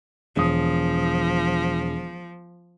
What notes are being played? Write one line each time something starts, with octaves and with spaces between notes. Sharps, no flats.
E1 F3 D#6